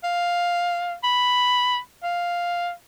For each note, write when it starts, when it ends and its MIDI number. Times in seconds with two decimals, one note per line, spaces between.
0.04 0.94 77
1.04 1.78 83
2.03 2.71 77